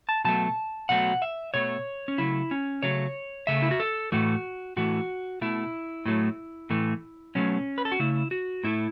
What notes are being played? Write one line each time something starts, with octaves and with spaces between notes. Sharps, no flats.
A5
B2 F#3 A3 A5
B2 F#3 A3 F#5
E5
B2 A3 C#5
C#4
C#3 F#3 A3 E4
C#4
C#3 F#3 A3 C#5
C#3 A3 E5
E4
F#4
A4
A2 E3 A3 F#4
A2 E3 A3 F#4
B2 A3 E4
A2 F#3 A3
A2 E3 A3
B2 F#3 A3 C#4
B4
A4
F#4
C#3 A3 E4
F#4
A2 A3 E4